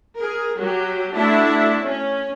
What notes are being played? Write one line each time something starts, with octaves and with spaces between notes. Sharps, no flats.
G#4 A#4
F#3 F#4 G4
A3 D4 E4 F#4 A5
C#4